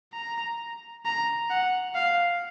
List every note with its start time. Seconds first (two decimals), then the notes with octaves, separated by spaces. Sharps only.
0.13 A#5
1.05 A#5
1.50 F#5
1.95 F5